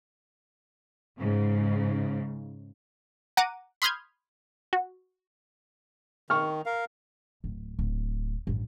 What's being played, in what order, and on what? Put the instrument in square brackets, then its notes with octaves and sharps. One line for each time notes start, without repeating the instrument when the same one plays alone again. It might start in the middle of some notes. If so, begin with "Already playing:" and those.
[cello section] G#2 C#3
[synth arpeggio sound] F#5 A#5 D6 D#7
B5 C6 D#6 F6 G6 G#6
F#4
[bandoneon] D#3 [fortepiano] C#6 F6
[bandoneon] A#4 F5
[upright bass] D1
D1
A1 G2